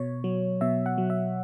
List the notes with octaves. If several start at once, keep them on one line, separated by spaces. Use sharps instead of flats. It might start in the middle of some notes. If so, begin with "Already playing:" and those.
Already playing: B2 C#5
F#3
B2 E5
F#5
F#3
E5